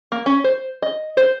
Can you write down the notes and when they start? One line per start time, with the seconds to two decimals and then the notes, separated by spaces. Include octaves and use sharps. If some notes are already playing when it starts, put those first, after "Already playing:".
0.12 A#3
0.26 C#4
0.44 C5
0.82 D#5
1.17 C5